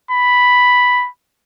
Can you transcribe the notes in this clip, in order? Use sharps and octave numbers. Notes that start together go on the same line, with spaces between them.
B5